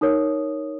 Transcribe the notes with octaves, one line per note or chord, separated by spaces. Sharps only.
D#4 A#4 C#5 D#6